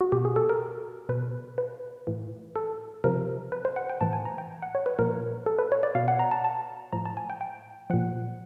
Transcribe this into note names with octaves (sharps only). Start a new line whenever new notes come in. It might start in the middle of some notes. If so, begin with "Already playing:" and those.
F#4
B2 G4
G#4
A4
A#4
B2 B4
B4
A2 E3
A4
C3 F3 A#4
B4
C5
F#5
G5
A2 E3 A5
G#5
A#5
G5
F#5
C#5
B4
A#2 F3 A#4
A4
B4
C#5
D5
B2 F5
F#5
A#5
A5
A5
A2 F3 A#5
A5
G#5
G5
G5
A#2 F3 F#5